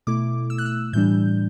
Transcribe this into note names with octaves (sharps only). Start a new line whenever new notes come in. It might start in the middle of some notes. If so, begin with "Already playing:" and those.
B2 A3 E4 D6
E6
F#6
E6
A2 E3 G3 D4 G6